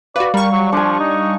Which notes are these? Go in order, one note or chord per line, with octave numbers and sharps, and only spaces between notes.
F#4 B4 D5 F5
G3 A#4 C#6
F#3
F3 D4 G#5
D#4